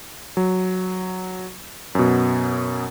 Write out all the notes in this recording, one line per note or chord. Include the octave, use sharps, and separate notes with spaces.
F#3
F#2 B2